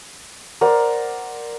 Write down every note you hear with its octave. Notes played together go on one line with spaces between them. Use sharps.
A#4 C5 D5 F#5